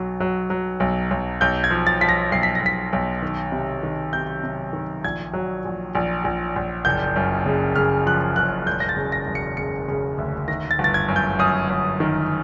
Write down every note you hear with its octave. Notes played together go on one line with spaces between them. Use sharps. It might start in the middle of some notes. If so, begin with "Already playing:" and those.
Already playing: B1 F#3
F#3
F#3
B1
B1
B1 G6
G#6
F3
A6
F3 B6
A#6
B1 C7
B6
A#6
B1 B6
B1
D#3
C3
D#3
C3 G6
C3
D#3
A#1 G#6
F#3
A#1
A#1
A#1
A#1
F#1 G6
F#2
C#3
C#3 F6
F3 F#6
F#1 F#6
E1 G6
A#6
A6
C#3
A#6
E1
C#7
C#3 C#7
C#3
D2
D#3 A#6
A6
G1
A6
G#6
F#2
G6
F#2 D#6
F#2
D#3